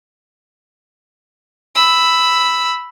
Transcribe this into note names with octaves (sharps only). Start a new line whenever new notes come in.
B5 E6